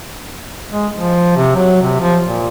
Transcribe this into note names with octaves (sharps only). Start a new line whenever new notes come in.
G#3
F3
C3
F#3
C3
F3
A#2